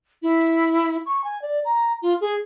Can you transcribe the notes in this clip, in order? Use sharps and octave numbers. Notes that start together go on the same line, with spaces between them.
E4
C#6
G#5
D5
A#5
F4
G#4